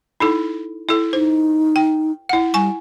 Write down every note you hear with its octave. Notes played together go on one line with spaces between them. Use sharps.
D#4 E4 A4
E4 A4
D#4 C5
G5
E4 F#5
G3 G#5 C#6